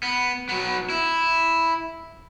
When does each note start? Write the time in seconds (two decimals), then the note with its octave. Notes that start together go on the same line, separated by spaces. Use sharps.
0.03 B3
0.49 F#3 B3
0.90 E4